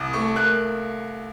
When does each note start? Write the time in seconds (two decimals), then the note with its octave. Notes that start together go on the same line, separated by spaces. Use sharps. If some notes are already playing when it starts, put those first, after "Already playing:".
Already playing: C2 D#6
0.13 A3 C#6
0.36 A#3 F#6